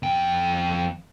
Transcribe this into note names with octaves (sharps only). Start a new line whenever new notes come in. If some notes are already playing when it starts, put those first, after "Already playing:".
F2 G5